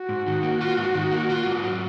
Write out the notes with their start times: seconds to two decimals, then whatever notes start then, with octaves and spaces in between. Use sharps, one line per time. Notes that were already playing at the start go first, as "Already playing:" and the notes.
Already playing: F#4
0.09 G#2
0.26 D#3
0.43 A#3
0.61 F4
0.77 G#2
0.95 D#3
1.11 A#3
1.29 F4
1.46 G#2
1.63 F#3